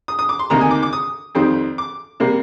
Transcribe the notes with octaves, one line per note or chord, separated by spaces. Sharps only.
D#6
D#6
D6
C6
D2 C3 D#3 A#3 D#4 A#5
G#5
D6
D6
D#6
F2 D#3 G3 C4
D6
C3 G3 A#3